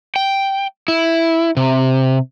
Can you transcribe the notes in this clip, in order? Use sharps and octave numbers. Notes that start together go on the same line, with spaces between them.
G5
E4
C3